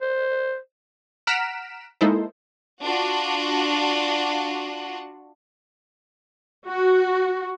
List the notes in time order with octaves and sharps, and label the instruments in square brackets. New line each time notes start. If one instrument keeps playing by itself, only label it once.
[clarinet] C5
[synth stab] F#5 A#5 F6 B6 D7 E7
G#3 A#3 D#4 E4 A4 C5
[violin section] D4 F4 F#4 F#5
[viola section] F#4